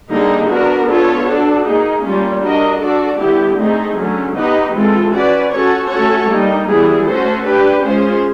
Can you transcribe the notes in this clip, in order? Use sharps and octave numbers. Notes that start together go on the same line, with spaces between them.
D3 G3 A#3 D#4 G#4
B3 D4 F#4 A#4
B3 D4 F4 A4 C#5
D4 F#4 A4
A#3 D#4 G#4
G3 A#3 C#4 F4
D4 F#4 A#4 D#5
D4 F#4 A4 D5
D3 G3 B3 E4 G4
A3 C4 D#4 G#4
D3 F#3 A3 C#4
B3 D#4 G4 B4 D#5
E3 G#3 C4 F4 A4
C#4 F#4 B4 D5
C#4 F#4 A4 C#5
A3 C#4 F#4 A4 C#5
G3 A#3 D#4
E3 G3 B3 E4 G#4
A3 C#4 F#4 A4 C5
D4 G4 B4
G#3 C#4 F4 G#4 C5